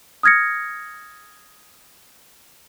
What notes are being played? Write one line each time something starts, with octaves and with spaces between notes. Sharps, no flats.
D#6 F6 G#6 A#6 C#7